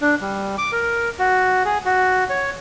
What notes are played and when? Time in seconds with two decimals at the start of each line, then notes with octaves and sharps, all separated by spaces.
0.01 D4
0.21 G3
0.58 D6
0.72 A#4
1.19 F#4
1.65 G#4
1.85 F#4
2.30 C#5